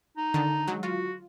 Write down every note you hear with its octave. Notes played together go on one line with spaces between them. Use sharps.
D#4
D3 D#3 A5
F#3 G#3
F4 F#4